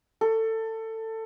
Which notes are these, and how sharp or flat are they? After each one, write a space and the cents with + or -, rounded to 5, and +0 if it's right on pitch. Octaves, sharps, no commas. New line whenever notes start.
A4 +20